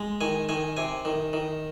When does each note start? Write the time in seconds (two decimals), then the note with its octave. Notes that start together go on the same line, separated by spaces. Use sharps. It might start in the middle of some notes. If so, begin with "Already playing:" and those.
Already playing: G#3
0.21 D#3 G#5
0.49 D#3 G#5
0.77 C3 G#5
1.05 D#3
1.33 D#3